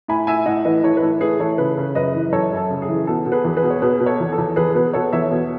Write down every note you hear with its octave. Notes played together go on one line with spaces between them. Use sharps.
A2 G#5 B5
A2 E5 G#5
A2 D#5 F#5
E3 B4 D#5
E3 A4 C#5
B4
A2 A4
A2 G#4 B4
E3 A4 C#5
C#3 G#4 B4
C#3
F#2 B4 D#5
E3
F#2 A4 C#5
F#2
A4
C#3
G#4
E3
B2 A4
B2
G#4 B4
E2
G#4 B4
B2
C#5
B2 G#4 B4
B2
A4 C#5
E2
A4
E2
E2 G#4 B4
B2 G#4 B4
B2 A4 C#5
E2 C#5 E5
B2